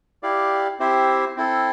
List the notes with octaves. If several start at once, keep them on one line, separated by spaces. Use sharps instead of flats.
E4 G4 D5 F5
C4 E4 G4 C5 E5
C4 E4 A4